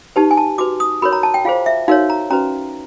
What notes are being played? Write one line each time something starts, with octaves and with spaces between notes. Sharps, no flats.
D#4 G4 B4 A5
G#5
A5
F#4 B4 D6
D#6
F#4 A#4 C#5 B5
A#5
A5
G5
F4 G#4 C5 F5
E5
D#4 F#4 A#4 C#5 F5
A#5
C#4 F#4 B4 A#5